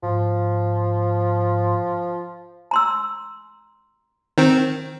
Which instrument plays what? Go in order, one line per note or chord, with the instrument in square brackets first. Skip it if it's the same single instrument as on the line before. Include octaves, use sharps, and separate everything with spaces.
[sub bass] G#2 [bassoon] F3
[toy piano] A#5 C6 E6
[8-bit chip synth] D#3 C4